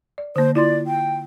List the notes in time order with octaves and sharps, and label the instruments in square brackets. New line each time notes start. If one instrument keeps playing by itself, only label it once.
[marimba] D5
[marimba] D3 A#3 [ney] C5
[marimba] E4 F4 C6 [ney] D5
[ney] G5